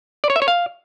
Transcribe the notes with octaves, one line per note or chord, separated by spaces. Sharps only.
D5
C#5
E5
C#5
F5